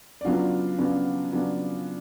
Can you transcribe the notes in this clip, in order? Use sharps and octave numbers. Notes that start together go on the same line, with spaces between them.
D5
C#3 F#3 B3 D4 F4 F5
C#3 F#3 B3 D4
C#3 F#3 B3 D4